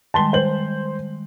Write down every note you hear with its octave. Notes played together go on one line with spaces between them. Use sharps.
D#3 G3 G#3 A5 C6 G7
C5 F#7